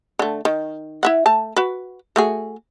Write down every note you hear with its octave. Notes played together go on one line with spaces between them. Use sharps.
D3 A3
D#3
E4 E5 F#5
A3 A5
F#4 B4
A3 F#4 G#4